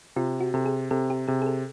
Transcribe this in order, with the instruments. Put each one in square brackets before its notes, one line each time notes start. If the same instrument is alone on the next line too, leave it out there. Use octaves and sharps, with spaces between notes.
[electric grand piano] C3 [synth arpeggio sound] F4
[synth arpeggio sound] F#4
[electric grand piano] C3 [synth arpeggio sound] A4
[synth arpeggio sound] G#4
[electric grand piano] C3 [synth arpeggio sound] A4
[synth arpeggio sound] G4
[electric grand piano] C3 [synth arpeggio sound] G#4
[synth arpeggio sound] G#4
A4